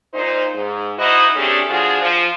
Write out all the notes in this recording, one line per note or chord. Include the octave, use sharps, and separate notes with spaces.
A#2 D#4 C5
G#2
D#4 E4 F#4 C5 D#5
C3 A3 C#4 D4 G4 G#4
F3 D4 F4 F#4 G#4
F3